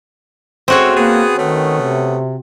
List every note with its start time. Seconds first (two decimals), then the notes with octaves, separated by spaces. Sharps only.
0.68 G#3 A3 C4 C#4 F#4 C#5
0.95 A#3 B3 G#4
1.37 D#3 A3 B3 C#4
1.81 C3